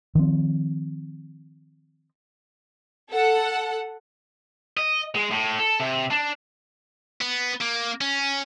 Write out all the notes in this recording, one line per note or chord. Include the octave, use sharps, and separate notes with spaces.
D#3 F3 C4
A4 F#5
D#5
G#3
A2
A4
C3
D4
B3
A#3
C#4